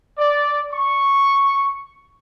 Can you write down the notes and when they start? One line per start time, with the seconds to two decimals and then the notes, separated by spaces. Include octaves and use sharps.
0.19 D5
0.74 C#6